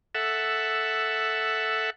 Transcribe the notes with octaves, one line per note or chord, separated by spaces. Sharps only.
A4 E5 F#5